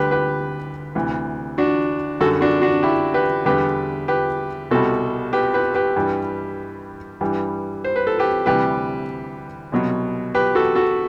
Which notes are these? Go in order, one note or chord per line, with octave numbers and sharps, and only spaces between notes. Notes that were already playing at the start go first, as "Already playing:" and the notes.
Already playing: D2 D3 G3 G4 B4
G4 B4
D2 C3 E3
D4 F#4
F#2 D3 G3 F#4 A4
D4 F#4
D4 F#4
E4 G4
G4 B4
E2 D3 G3 G4 B4
G4 B4
C2 B2 G3 F#4 A4
G4 B4
G4 B4
G4 B4
G2 E3 G3
G2 E3 G3
C5
B4
A4
G4 B4
D2 C3 E3 G3 G4 B4
C2 B2 F#3
G4 B4
F#4 A4
F#4 A4